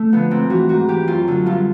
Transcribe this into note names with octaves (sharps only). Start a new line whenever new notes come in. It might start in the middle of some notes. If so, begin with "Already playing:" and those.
Already playing: A3
D3 F3 B3
G#2 C4
E3 F#4
G#2 F#4
E3 G4
F#2 F4
D3 F#3
G2 F4